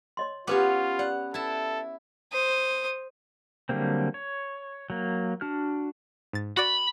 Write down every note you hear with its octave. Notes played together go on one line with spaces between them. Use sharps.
C#5 D#5 C6
B3 C#4 F4 G4 B4 C#5 D6
D5 F#5
E4 A4 A5
C5 D#6
D3 F#3 G3 A#3 C4
C#5
F#3 A#3
D4 F#4 F6
G#2 A6
F#4 D5 B5